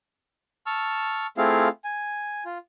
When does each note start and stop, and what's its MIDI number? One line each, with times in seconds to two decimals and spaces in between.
0.66 1.27 81
0.66 1.27 85
0.66 1.27 88
0.66 1.27 89
1.38 1.68 57
1.38 1.68 60
1.38 1.68 64
1.38 1.68 65
1.38 1.68 68
1.38 1.68 77
1.84 2.44 80
2.45 2.58 65